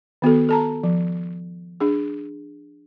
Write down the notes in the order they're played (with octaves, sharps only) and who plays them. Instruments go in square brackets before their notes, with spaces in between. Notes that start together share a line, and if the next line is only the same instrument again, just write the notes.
[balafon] D#3 B3 F#4 A4
A4 A5 A#5
F3
D4 G#4